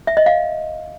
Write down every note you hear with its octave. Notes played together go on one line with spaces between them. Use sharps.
E5
D#5
F5